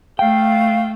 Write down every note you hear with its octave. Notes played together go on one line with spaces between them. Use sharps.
A3 F5 G5